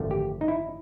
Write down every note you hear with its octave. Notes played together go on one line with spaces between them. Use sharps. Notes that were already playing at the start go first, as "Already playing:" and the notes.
Already playing: G#1 F#2 D3 F3 A3
G4
D#4
E4